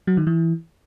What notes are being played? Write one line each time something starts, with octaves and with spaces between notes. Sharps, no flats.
F#3
D#3
E3